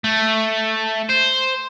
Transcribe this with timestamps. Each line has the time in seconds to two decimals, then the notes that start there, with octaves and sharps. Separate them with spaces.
0.04 A3
1.10 C5